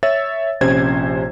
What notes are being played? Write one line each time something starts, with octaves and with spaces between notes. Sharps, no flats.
C#5 E5 E6 A6
A#1 C3 C#4 C5 G#6